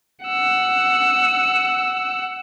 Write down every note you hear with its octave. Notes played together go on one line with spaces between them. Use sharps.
F#5 E6